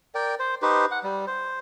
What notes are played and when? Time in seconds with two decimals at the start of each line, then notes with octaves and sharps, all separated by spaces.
0.15 A#4 D5 G5
0.39 C5
0.62 D#4 G4 B4 C5
0.91 F#5
1.04 G3
1.27 C5